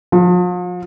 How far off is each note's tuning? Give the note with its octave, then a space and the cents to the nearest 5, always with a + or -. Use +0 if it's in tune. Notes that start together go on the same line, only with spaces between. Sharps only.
F3 +40